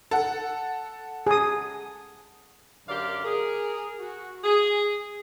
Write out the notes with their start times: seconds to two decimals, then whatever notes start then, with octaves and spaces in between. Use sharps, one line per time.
0.11 A4 F#5
1.27 G#4 D#6
2.88 F#2 D3 G4 A#4 D5 F5
3.24 G#4 A#4
3.99 F#4
4.44 G#4